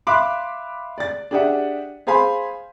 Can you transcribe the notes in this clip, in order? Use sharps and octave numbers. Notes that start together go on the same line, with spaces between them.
E5 F5 B5 C6 D6 F#6
D5 A6
D4 G4 G#4 D5 E5 F#5
G#4 C5 F5 G#5 B5 C6